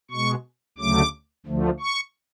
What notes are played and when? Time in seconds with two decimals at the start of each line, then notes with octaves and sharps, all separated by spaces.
0.11 B2 G#3 C#6
0.78 D2 C#3 F#3 A3 D6
1.46 D2 D3 F3 A3
1.80 C#6